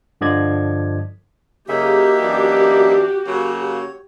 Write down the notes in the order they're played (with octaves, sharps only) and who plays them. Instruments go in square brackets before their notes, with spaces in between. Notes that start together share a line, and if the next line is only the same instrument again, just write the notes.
[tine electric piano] G2 D3 F3 D5 D#5 G#6
[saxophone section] F#2 C#3 [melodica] A#3 D#4 E5 [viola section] F#4 G4
[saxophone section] F#2 E3 D4
[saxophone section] C#3 F#3 A#3 [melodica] C#5
[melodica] C#5